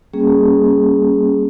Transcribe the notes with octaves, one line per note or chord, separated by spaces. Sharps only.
G3 A#3 C#4 G#4